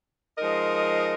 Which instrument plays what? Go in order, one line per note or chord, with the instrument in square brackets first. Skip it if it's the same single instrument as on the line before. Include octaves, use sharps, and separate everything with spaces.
[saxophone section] F3 G#3 D#4 A#4 D#5